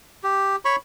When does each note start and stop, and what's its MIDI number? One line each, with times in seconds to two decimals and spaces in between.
0.24 0.56 67
0.65 0.76 73
0.65 0.76 83
0.65 0.76 85